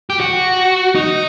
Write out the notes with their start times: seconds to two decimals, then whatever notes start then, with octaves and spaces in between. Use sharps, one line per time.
0.10 G4
0.20 F#4
0.95 D#4